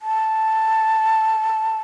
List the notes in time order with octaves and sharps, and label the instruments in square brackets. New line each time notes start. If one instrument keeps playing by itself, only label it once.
[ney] A5